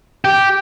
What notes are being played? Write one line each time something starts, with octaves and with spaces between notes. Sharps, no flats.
G4